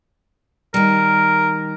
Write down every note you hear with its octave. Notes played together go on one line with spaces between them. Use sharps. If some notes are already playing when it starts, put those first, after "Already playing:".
D#3 G3 A#4